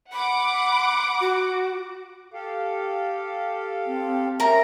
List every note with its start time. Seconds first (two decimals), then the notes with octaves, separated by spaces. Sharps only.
0.12 F#5 B5 D6
1.20 F#4
2.34 G4 A4 F5
3.86 C4
4.40 C#4 A#4 E5 A#5